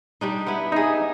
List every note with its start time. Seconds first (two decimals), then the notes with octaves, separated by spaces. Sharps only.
0.21 G3 D4 D#4
0.47 B3 E4
0.72 D#4 G#4 E5